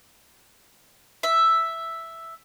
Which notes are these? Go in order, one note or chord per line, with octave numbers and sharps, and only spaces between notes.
E5